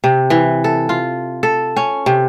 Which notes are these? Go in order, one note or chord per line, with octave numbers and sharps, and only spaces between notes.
C3
E3
A4
F4
A4
C#4
C3